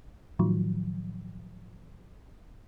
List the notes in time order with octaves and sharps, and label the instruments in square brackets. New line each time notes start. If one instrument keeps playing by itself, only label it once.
[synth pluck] A2 D#3 F3 F#3